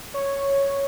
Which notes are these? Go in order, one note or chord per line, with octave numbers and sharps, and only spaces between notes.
C#5